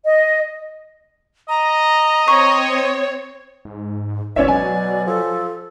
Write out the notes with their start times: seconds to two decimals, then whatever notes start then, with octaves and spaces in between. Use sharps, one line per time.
0.05 D#5
1.49 D#5 A#5
2.28 C4 C#5 C#6
3.65 G#2
4.36 G#1 B2 C#4 C#5 D5 E5
4.48 F#3 D5 G#5
5.07 F3 A4